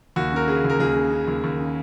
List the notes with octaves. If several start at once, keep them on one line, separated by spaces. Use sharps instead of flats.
D#2 F#4
C#3 A#4
C#3 G#4
D#2
A#4
D#2 G#4
C#3
C#3
D#2
D#2
C#3